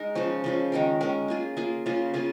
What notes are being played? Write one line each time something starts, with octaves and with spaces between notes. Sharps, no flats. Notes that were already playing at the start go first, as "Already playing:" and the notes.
Already playing: G#3 D#4 A#4
C#3 F3 C#4
C#3 F3 C#4
D#3 G#3 C#4 A#4
D#3 G#3 C#4 A#4
A#3 F4 G#4
A#3 F4 G#4
C#3 A#3 F4 G#4
C#3 A#3 F4 G#4